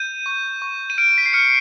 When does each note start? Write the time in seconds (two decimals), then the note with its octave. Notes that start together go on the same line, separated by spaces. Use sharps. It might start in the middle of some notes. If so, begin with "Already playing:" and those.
Already playing: G6 D#7
0.26 C#6
0.62 C#6
0.90 D#7
0.98 F6 D7
1.18 B6
1.26 C7
1.33 F6 C#7